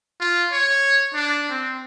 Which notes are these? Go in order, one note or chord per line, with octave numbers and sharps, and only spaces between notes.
F4
C#5
D4
C4